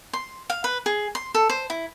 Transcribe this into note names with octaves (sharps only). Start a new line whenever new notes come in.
C6
F5
B4
G#4
C6
A4
C5
E4